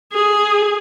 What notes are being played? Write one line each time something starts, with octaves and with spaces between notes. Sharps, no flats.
G#4